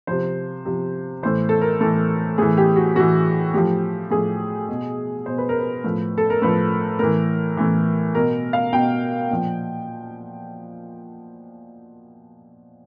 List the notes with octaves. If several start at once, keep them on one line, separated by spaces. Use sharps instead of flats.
C3 F3 C5
C3 F3
A2 E3 C5
A4
A#4
A2 E3 A4
A2 E3 G#4
G4
F#4
A2 E3 F#4
A2 F3 G4
A2 F3 G#4
B2
B2 C5
B4
A#4
B4
A2 F3
A4
A#4
A2 F3 B4
A2 E3 A#4
A2 E3
B2 A#4
F5
B2 G5
A#2 F3